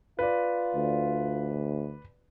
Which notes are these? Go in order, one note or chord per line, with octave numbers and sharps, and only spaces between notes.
F4 B4 D5
D2